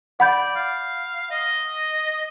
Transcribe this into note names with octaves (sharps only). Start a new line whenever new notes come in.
D5 F#5 B5 G6
F5
D#5